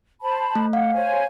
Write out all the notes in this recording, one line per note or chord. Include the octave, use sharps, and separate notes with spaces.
C5 A5 B5
A3
F5 F#5
C5 C#5 G#5